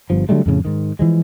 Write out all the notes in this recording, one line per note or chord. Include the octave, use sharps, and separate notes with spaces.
G1 G2 F3
D3 F#3 G3 A3
F2 A2 C#3
G#2 D#3
E3 F3 G#3